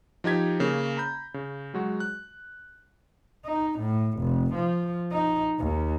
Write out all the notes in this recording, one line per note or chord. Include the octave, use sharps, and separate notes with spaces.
F3 D#4 G4 G#6 B6
C#3 A#3
A#5 B5 G6
C#3
F#3 G#3 F#4
F#6
D#4
A2
F1
F3
D#4
D#2